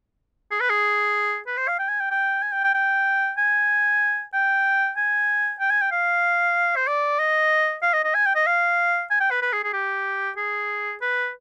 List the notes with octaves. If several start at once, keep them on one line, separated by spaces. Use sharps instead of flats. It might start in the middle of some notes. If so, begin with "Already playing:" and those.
G#4
B4
G#4
B4
C5
F5
G5
G#5
G5
G5
G#5
G5
G5
G5
G#5
G5
G#5
G5
G#5
G5
F5
C5
D5
D#5
F5
D#5
D#5
G#5
G5
D#5
F5
G#5
G5
B4
B4
G#4
G#4
G4
G#4
B4